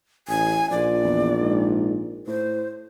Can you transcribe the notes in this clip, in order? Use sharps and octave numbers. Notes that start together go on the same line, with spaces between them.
A1 G#5
A#1 F3 D5
E2
G#2
A2 C5